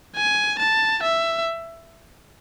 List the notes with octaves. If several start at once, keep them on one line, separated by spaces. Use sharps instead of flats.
G#5
A5
E5